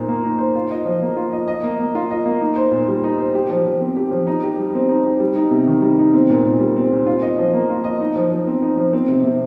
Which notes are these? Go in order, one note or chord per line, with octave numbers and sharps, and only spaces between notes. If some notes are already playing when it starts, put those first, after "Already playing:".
Already playing: A#2 D#4 C5
A#3
D#4
C5
F4
D#5
F3
A#3
F4
D#5
D#5
A#3
A#3
F4
D#5
A#3
D#4
C5
A#2
G3
D#4
C5
G4
F3
F3
C4
G4
F3
D#4
G4
G3
C4
D#4
G4
G3
D#4
C3
D#3
G3
D#4
C4
A#2
A#2
G3
C4
A#2
F4
D#5
F3
A#3
F4
D#5
D#4
F3
F3
C4
D#4
F3
C4
C3
C3